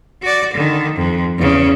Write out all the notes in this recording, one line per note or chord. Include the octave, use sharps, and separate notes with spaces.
F#4 D5
D3 D#3
F2
E2 C#3